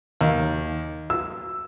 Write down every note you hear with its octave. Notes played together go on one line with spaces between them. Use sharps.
D#2
E6